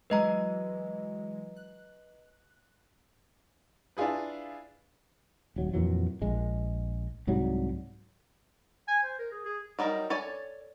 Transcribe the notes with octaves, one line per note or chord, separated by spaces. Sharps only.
E3 F#3 G#3 B4 D#5 A#5
F#6
D4 E4 F4 G#4 B4
D#1 F#3
F2 A#2 E3 F#3
A#1 G#3
C2 G#2 F#3 G3
G#5
C5
A#4
G#4
G#4
F#3 G3 D#4 A#4
A4 C#5 D5 G#5